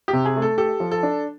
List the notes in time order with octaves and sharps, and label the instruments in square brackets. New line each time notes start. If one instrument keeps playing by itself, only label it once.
[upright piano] G4
[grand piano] C3
[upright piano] G#4
[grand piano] A3
[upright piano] A4
[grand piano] G4 [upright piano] A4
[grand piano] F3
[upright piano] A4
[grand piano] D4